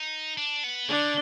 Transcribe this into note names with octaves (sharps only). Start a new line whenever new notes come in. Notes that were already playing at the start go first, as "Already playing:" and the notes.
Already playing: D#4
D4
B3
D3 D4